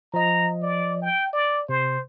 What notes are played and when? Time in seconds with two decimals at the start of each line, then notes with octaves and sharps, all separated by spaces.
0.14 F3 D#5 A#5
0.62 D5
1.02 G5
1.33 D5
1.69 C3 C5